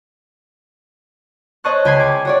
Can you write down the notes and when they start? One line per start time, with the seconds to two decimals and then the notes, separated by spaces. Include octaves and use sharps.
1.64 C5 C#5 D#5 A5 C#6 F#6
1.85 C#2 G5 G#5 B5 G#6 C7
1.99 D6 G#6
2.25 F#4 C#5 D5